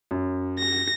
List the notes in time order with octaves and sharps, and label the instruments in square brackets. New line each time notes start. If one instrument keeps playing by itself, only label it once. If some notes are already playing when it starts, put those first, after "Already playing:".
[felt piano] F#2
[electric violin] A#6